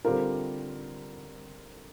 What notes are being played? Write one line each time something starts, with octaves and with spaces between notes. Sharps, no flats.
D3 G3 C4 F4 A#4